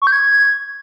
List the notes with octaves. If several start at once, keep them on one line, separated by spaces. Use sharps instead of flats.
C#6
G6
G#6